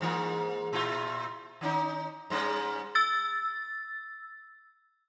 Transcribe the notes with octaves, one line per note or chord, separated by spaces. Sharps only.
G#2 E3 A#3
A#2 E4 F4
D#3 C#4 D#4
G#2 G3 C#4
E6 A6